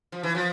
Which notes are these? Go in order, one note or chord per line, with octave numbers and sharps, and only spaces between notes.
F3
E3
F3